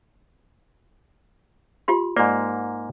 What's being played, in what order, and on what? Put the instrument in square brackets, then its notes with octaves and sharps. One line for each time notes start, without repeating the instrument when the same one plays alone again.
[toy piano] F4 G4 C6
[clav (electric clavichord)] G#2 A#3 [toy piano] D5